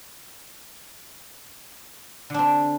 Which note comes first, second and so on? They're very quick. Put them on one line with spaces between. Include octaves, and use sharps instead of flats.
D3 D4 C4